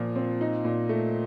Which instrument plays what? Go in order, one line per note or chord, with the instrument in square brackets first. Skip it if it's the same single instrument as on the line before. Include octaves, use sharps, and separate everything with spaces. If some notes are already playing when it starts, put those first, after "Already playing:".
Already playing: [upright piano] A#2 F3
C4
D#4
A#2
A3